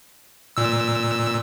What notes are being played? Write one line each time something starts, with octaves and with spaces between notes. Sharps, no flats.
A#2 E6